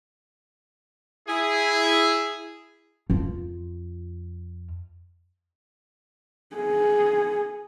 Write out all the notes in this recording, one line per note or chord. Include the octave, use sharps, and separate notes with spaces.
E4 G#4
F2 F4
G#4